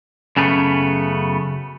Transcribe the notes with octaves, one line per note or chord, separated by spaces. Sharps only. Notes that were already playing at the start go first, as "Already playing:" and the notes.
F#2 C#3 A3 B3